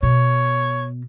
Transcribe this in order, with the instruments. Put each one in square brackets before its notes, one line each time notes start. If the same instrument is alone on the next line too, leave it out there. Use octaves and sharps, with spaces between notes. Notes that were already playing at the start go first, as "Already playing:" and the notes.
[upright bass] B2 [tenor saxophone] C#5